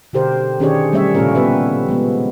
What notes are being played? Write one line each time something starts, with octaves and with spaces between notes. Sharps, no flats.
B2 D3 G4 A#4 C5
D#3 C#4 D4 G4 G#4 C#5
F#3 G3 A3 C#4 C#5 E5
A#2 C#3 A3 C#4 F4 A#4
B3 G4 B4 E5
F3 G#3 B3